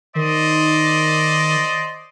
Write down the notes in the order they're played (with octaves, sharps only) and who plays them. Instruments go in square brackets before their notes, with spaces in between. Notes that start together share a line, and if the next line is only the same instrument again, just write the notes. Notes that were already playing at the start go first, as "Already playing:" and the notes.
[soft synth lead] D#3 [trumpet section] C5 D5 D#5